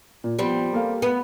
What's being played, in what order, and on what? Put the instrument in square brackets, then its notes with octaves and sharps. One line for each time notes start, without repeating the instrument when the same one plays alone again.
[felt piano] A#2
[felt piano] F3 B3 [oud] G3 C4
[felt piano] A#3 A4 F5
[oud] B3